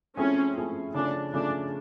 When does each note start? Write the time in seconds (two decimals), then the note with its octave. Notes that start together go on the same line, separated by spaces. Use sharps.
0.17 F3 A3 C4 C#4 E4 G#4
0.56 F3 A3 C4 E4 G#4
0.94 C#3 F3 A3 C#4 D4
1.34 C#3 F3 A3 C#4 D4